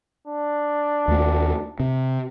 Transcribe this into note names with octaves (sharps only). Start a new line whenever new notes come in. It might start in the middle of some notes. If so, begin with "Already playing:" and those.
D4
D#2 A3
C3